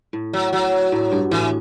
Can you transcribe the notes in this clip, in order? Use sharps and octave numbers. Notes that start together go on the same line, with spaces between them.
A2
F#3
F#3
A2
G2
A2 E3